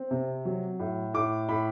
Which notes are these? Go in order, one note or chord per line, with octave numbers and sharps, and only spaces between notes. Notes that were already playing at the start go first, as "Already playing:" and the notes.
Already playing: C4
C3
F#3
A2
A2 D6
A2 B5